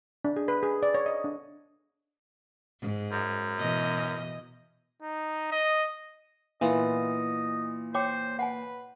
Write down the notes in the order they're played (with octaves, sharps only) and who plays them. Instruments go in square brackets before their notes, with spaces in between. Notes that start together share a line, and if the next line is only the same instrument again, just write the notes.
[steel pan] D4
G#4
B4
G#4
D5
C#5
D#5
D4
[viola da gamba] G#2
[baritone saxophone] F#2
[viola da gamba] B2 E3 D#5
[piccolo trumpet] D#4
D#5
[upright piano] A#2 B3 [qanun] E3 F4 F#5 [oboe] D#5
[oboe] C5 [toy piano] C#5 G5 D6 [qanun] C#6
[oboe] B4 [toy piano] F#5 G#5